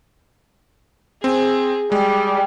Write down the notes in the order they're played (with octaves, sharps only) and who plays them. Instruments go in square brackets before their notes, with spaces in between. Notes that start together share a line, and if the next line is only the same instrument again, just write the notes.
[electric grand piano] C4 [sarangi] G#4
[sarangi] G3 [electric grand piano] G#3